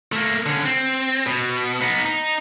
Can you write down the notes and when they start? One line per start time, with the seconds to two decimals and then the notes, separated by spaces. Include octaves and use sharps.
0.12 A3 A#3
0.46 D3 C#4
0.65 C4
1.26 B2
1.81 B3 D#4
2.05 D#4